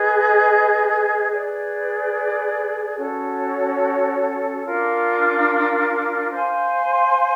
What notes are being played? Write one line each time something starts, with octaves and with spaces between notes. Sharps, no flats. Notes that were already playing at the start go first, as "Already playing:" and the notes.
Already playing: G#4 B4 D#5
G#4 B4 D5
C#4 F#4 A4 C#5
D4 F4 A#4
C5 F5 G#5 C6